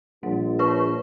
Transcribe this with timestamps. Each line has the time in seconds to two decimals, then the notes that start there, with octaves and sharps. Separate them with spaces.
0.23 A#1 G3
0.59 B4 C#5 C#6